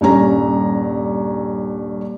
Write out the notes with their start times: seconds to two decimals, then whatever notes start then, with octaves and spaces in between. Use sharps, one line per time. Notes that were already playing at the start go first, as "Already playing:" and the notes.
0.01 D#1 G2 C#4 A#5